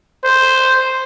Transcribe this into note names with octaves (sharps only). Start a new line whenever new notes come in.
C5